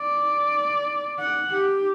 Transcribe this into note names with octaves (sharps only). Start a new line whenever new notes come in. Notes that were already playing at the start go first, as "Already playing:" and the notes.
Already playing: D5
F#5
G4